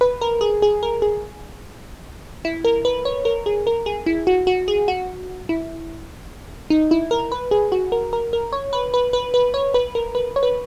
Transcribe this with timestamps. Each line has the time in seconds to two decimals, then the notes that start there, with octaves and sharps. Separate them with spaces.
0.01 B4
0.21 A#4
0.41 G#4
0.62 G#4
0.83 A#4
1.02 G#4
2.45 E4
2.65 A#4
2.85 B4
3.05 C#5
3.25 A#4
3.46 G#4
3.67 A#4
3.86 G#4
4.06 E4
4.27 F#4
4.47 F#4
4.68 G#4
4.88 F#4
5.49 E4
6.70 D#4
6.91 E4
7.11 A#4
7.32 B4
7.51 G#4
7.72 F#4
7.92 A#4
8.13 A#4
8.33 A#4
8.52 C#5
8.73 B4
8.94 B4
9.13 B4
9.34 B4
9.54 C#5
9.74 B4
9.95 A#4
10.15 B4
10.36 C#5
10.43 B4